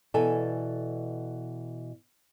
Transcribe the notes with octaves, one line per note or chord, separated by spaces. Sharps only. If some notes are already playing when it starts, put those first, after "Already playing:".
B2 E3 A4 D5 G#5